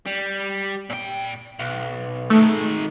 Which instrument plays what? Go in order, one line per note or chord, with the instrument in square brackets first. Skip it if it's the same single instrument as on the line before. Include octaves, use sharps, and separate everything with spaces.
[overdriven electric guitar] G3
A#2 G5
B1
[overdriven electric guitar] D#3 G#3 [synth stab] A3